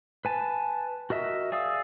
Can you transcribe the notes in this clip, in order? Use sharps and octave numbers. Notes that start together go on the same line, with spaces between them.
B4 G#5 A5
F#4 A#4 D#5 E5
G#4 D5 F5 D#6 E6